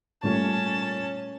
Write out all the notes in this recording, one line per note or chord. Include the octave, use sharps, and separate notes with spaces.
A#2 G3 A3 C#4 A5